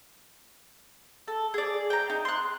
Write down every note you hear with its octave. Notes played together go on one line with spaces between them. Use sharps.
A4
G#4 D5
G5 A#5
D#4
C6 F#6